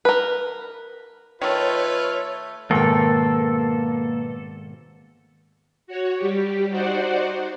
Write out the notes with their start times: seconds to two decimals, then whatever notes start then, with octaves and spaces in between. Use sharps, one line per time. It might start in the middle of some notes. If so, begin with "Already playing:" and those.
0.05 A#4 B4
1.41 D#3 A3 F4 B4 C#5
2.71 G#1 B2 A#3 A4 G5
5.87 F#4 C#5
6.17 G3 G4
6.69 D#4 F#4 C5 D5 F#5